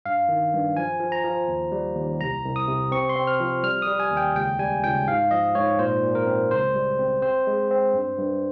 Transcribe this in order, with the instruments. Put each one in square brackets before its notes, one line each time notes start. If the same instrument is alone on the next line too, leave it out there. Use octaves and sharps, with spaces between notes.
[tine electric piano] G2 F5
D#3
G2
F3 G#5
F3
A#5
F3
D#2
G3
D#2
C2 A#5
C2
D#6
C3
C4 C#6
C6
C4
F6
F3
G3 F6
G3 D#6
G#5
D#2
G5
C#2 G5
G3 G#5
C#2 G5
G#2 F5
F3 D#5
G#2 C#5
A#2 C5
A#2
A#4
C4
C#2 C5
G3
C4
C4 C5
G#3
C4
G2
G2